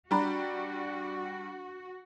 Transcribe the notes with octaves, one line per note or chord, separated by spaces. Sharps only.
G3 D4 F#4 G4 A#5 B5